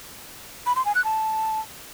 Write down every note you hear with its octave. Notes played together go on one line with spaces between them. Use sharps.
B5
C6
G#5
F#6
A5